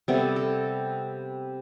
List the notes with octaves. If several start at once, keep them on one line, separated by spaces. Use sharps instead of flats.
C3 G3 B3 A4
A4